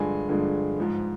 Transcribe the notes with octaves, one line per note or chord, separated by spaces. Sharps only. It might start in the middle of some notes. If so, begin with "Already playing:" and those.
Already playing: G2 D3 F3 G#3 G#5
G2 D3 F3 G#3
G#2 F3 G#3